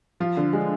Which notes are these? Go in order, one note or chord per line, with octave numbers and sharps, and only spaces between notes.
F3 F4
D3
G#3